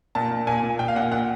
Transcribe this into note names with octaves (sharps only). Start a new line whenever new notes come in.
A#2 A5
A#2
A#2 G#5
A#2
A#2 G5
F5
A#2 F#5
A#2 F#5